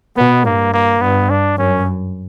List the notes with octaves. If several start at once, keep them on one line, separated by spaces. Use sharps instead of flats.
B2 B3
G2 A#3
A#3
G2 B3
D4
F#2 C#4